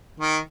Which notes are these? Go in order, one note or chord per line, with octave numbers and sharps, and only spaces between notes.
D#3